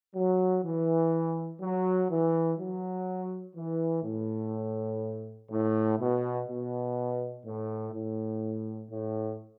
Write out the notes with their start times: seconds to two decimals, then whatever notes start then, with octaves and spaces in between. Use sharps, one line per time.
0.15 F#3
0.63 E3
1.60 F#3
2.09 E3
2.58 F#3
3.55 E3
4.03 A2
5.50 A2
5.98 B2
6.47 B2
7.44 A2
7.93 A2
8.90 A2